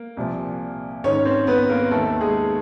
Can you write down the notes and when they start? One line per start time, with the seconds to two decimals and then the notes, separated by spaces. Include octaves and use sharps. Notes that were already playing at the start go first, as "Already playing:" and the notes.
Already playing: A#3
0.17 C2 A#2 F3
1.04 G#2 D#3 C#4 C#5
1.25 C4 C5
1.47 B3 B4
1.69 A#3 A#4
1.91 D#2 D#3 A3 A4
2.21 G#3 G#4